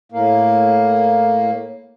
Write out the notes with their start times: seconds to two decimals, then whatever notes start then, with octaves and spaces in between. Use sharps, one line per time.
0.12 A2 A#3